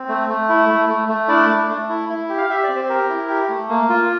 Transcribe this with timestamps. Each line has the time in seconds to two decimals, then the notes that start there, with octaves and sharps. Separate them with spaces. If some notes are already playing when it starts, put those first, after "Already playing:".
Already playing: C4
0.08 A3
0.29 A3
0.49 E4
0.69 A3
0.89 A3
1.09 A3
1.28 D4 E4 D5
1.49 A3
1.69 A3
1.89 E4
2.09 E4
2.29 G4
2.38 F5
2.49 G4 E5
2.63 D5
2.69 C4
2.76 C5
2.89 G4 A#4
3.10 E4
3.29 G4
3.49 A3
3.69 A#3
3.89 F4